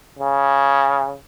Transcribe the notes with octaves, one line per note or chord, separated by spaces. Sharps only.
C#3